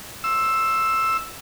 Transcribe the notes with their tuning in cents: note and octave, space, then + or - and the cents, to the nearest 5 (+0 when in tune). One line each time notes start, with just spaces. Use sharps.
C6 +30 E6 +0